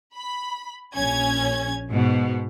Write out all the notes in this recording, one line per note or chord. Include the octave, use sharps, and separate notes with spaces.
B5
A#1 C#4 G#6
G#2 B2